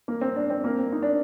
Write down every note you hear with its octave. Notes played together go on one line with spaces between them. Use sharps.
A#3
C4
D4
C4
A#3
C4
D#4
D4